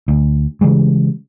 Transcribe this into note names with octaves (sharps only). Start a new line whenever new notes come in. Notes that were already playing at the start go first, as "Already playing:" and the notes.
D2
C#3 E3 G3 G#3